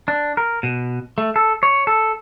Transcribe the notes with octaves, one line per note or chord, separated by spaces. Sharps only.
D4
A#4
B2
A3
A4
C#5
A4